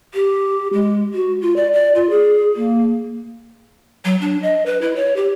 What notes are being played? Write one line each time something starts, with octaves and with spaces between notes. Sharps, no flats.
G4
G#3
F#4
F4
D5
D5
F4
G#4
A#3
F#3
D4
D#5
B4
E4
C#5
G4